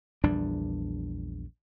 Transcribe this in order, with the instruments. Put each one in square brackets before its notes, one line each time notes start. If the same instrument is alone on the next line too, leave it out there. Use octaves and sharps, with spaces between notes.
[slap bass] A#1 E2 G3 D4